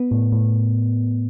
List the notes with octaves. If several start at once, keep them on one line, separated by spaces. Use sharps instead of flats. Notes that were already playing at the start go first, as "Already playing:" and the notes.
Already playing: B3
A2
A2